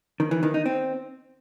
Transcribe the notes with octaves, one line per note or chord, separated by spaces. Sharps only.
D#3
E3
D#3
D#4
C4